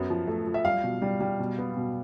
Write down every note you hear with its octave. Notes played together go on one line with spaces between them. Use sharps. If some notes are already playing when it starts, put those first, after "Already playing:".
Already playing: F#2 B3
F3
A3
F3
E5
G3 F5
B2
G3
G3
B2
B3
B2